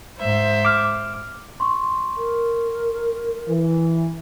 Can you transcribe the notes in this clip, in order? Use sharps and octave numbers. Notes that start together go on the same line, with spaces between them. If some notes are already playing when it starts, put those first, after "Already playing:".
G#2 C5 E5
D6 F6
C6 C#6
A#4
E3